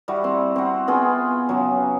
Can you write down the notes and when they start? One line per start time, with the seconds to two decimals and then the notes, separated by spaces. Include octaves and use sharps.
0.08 G3 E4 F#4
0.24 C4
0.56 C4 F#4
0.88 B3 F4 G#4 G5
1.49 C#3 F#3